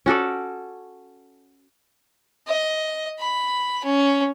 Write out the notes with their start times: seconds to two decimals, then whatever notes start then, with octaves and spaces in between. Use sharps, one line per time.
0.06 C#4 F#4 A4 D5
2.47 D#5
3.19 B5
3.84 C#4